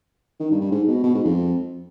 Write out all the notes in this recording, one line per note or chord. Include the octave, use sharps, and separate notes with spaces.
D#3
G2
G2
G#2
B2
B2
G#2
F2